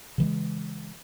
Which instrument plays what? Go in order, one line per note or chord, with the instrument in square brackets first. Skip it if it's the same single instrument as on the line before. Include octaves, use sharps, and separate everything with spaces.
[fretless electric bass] C#3 E3 G#3